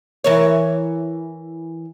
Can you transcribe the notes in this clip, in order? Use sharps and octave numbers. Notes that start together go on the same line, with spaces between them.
E3 A#4 C#5